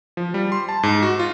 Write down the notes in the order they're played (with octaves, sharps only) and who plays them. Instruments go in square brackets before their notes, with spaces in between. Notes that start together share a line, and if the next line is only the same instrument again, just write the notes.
[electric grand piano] F3
G3
C6
A5
G#2
F#4
F4